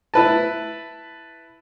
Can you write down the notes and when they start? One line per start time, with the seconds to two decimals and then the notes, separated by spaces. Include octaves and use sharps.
0.14 E4 B4 A5